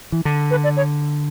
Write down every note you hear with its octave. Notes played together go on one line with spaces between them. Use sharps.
E3
D3
B4
D5
C#5